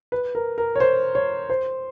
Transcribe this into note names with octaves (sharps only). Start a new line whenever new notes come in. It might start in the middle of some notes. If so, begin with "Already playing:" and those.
B4
A#4
A#4
C#5
C5
C#5
C5